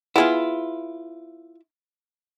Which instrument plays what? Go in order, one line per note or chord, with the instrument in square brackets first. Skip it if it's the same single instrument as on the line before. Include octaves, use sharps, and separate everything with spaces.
[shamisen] B3 G#4 [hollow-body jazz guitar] E4 F4